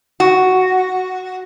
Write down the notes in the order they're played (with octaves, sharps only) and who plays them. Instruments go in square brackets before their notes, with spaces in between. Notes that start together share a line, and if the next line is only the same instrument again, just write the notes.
[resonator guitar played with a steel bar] F#4